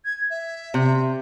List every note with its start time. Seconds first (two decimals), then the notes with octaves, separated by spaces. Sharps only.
0.05 G#6
0.30 E5
0.74 C3